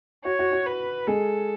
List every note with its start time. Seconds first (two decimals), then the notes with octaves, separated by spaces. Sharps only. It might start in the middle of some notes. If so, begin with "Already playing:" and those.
0.25 F#4 C#5
0.39 F#4
0.52 F#4
0.66 B4
1.07 G#3 G#4 A4